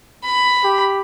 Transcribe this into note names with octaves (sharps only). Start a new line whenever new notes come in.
B5
G4